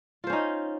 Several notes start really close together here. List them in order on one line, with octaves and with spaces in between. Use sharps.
F4 C5 C#4 D#4